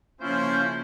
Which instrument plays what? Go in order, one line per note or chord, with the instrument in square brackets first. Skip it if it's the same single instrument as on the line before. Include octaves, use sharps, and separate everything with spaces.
[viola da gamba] C#3 F3 A#3 [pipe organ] C#4 F4 G6 [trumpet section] E4 C5